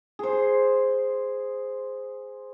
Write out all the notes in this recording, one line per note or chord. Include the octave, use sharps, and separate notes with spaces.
G#4 C5